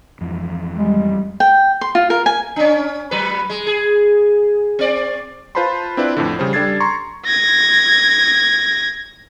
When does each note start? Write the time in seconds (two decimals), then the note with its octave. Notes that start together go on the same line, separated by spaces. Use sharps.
0.21 F2 G#2 E3
0.77 G3 G#3
1.40 G5
1.81 C6
1.95 F4
2.10 A#4
2.26 G#5
2.56 C#4 D4
3.11 F#3 B4
3.50 G#3
3.67 G#4
4.79 C4 D5
5.55 F4 B4 C5 A5 B5 C6
5.97 C4 D4 E4 F4 B4 D5
6.17 F2 A2 D3
6.39 C#3 G3 C5
6.53 G3 D4 A4 G#6 A6 C7
6.80 A#5 C6 C#6
7.26 G#6 A#6